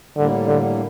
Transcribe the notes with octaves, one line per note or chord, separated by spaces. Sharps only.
A2 D3 G3 A#3
D3